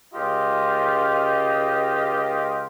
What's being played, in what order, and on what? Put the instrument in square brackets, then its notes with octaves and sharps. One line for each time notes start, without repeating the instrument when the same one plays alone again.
[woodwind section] C#2 F4 G4 D#5